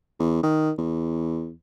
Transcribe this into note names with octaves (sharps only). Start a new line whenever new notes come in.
E2
D#3
E2